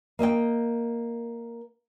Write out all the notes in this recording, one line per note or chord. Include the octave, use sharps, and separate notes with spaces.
A#3 D#5 E5 G5